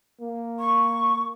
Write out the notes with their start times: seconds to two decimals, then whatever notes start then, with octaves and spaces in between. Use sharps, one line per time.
0.21 A#3
0.59 C#6